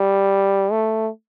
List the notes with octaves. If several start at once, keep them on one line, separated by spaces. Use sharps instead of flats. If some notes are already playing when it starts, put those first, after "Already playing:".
Already playing: G3
A3